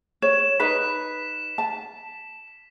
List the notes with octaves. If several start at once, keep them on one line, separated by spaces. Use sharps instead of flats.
C#5 E7
D#4 B4 B5 B6 E7
A5